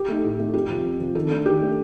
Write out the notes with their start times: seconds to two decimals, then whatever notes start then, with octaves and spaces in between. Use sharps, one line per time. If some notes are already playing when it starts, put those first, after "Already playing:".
Already playing: G4
0.08 A3 D#4
0.24 A2
0.39 A3 D#4
0.54 F2 G4
0.69 C3 F3
0.85 F2
1.00 C3 F3
1.15 D#3 A4
1.31 A3 D4
1.46 D#3 G4
1.61 A3 D4